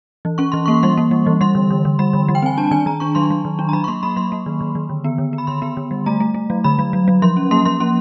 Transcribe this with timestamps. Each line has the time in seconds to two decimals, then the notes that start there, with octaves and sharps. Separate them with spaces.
0.25 E3
0.38 C#4 C#6
0.52 E3 C6
0.66 A#3 C#6
0.83 G3 C6
0.98 A#3
1.11 G3
1.27 E3
1.41 G3 C6
1.55 D3
1.71 D3
1.85 D3
1.99 G3 B5
2.13 D3
2.29 G3
2.35 G5
2.42 C4 G#5
2.58 D4 A5
2.71 D#3 G#5
2.86 D#3 A#5
3.00 D4 C#6
3.15 F#3 C6
3.30 F#3
3.45 D#3
3.59 D4
3.69 A#5
3.73 F#3 B5
3.84 C#6
3.88 A#3 C6
4.03 A#3 B5
4.16 F#3 C6
4.32 A#3
4.46 D#3
4.61 D#3
4.75 D#3
4.90 D3
5.04 B3
5.18 D3
5.33 B3
5.38 B5
5.47 D3 C6
5.62 B3
5.77 D3
5.91 G3
6.06 A3 A#5
6.20 A3
6.34 A3
6.50 F#3
6.64 D3 B5
6.79 F#3
6.93 F#3
7.08 F#3
7.22 F3 C6
7.37 C#4
7.51 A#3 C6
7.65 F3 C6
7.80 C#4 C6